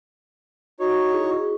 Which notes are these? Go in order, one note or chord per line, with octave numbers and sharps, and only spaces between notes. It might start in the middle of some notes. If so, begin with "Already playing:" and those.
D#4 F#4 C#5
E4 G#4 C#6